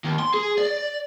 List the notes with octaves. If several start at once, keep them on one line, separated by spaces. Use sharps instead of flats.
D#2
C6
G#4
D5